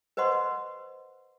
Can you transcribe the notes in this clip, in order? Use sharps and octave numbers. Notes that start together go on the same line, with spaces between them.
B4 C5 D#5 F#5 C6 C#6